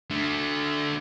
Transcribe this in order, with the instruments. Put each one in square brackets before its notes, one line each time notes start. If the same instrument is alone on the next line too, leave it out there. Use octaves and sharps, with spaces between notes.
[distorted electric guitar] D3 A3